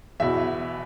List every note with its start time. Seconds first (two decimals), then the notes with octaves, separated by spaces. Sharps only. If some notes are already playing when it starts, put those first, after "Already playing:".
0.20 E2 B2 E5